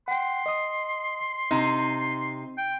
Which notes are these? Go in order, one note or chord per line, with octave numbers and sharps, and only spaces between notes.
F#5 G5 C6
D#5 D#6
C3 C4 D#4
G5